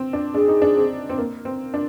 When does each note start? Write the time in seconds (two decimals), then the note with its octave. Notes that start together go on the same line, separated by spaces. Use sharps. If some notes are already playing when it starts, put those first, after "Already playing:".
Already playing: C4
0.13 D4
0.34 D4 G#4
0.48 D#4
0.62 D4
0.77 C4
1.10 C4
1.18 A#3
1.45 C4
1.74 D4